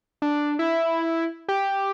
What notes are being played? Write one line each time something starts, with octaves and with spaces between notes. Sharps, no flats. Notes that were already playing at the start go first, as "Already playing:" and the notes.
D4
E4
G4